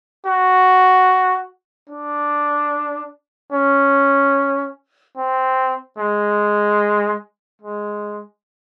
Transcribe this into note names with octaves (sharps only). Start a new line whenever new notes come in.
F#4
D4
C#4
C4
G#3
G#3